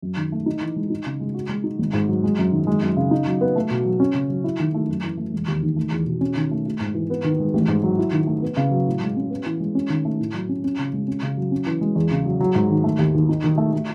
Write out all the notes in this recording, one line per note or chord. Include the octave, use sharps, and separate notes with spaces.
F#2
D#3
A3
D#4
E3
G#3
D#4
C#3
G#3
F#4
G#3
D#4
G#1
G#2
F#3
G#3
F#2
D#3
G#3
F#2
C#3
D#4
F#3
B3
A3
B2
F#3
C#4
C#3
F#3
E4
D#3
A3
F#2
E3
A3
E1
D#2
D#3
A3
E2
B2
C#4
D#3
A3
A3
G#2
E3
B3
D#3
G#3
A1
G#2
F#3
E4
D#3
A3
B3
C#3
F#3
A2
G#3
C#4
B3
E3
G#3
C#4
D#3
A3
A2
F#3
C#4
C#4
C#3
G#3
C#4
C#3
F#3
C#4
E3
G#3
E2
C#3
F#3
F#3
G#2
D#3
A3
D#2
D#3
D#4
D#3
A3
A3